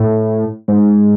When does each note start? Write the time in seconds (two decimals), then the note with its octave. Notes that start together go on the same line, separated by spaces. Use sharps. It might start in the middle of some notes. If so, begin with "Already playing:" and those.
Already playing: A2
0.68 G#2